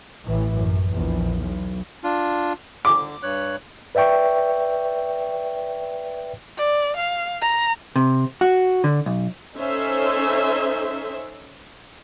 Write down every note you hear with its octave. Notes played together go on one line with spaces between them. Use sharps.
A1 A2 E3
F#2
A#1 E2
B1
D4 F4
D3 D6
G2 C#5 F#6
B4 D5 E5 G5 C#6
D5
F5
A#5
C3
F#4
D3
B1
C#4 D#4 A4 C5 E5